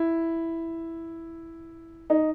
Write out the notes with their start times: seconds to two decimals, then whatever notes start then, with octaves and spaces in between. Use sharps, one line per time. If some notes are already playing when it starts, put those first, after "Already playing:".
Already playing: E4
2.10 D#4